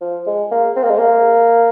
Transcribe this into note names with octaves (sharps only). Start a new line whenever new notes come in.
F3
G#3
A#3
C4
A#3
G#3
A#3